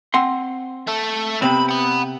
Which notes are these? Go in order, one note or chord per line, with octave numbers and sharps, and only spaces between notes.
C4 F#5 C6
A3 A4
C3 B3 C4 B5
F#5 B5